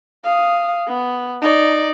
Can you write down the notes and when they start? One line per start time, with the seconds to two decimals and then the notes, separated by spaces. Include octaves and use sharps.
0.24 F5 D#6
0.88 B3
1.42 D#4 D5